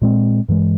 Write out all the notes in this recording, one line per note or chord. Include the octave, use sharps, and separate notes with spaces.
A#2 G#3 C4
G2 E3 G#3